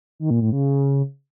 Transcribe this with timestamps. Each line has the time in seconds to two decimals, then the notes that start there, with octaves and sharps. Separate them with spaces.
0.19 D#3
0.30 A#2
0.41 A2
0.52 C#3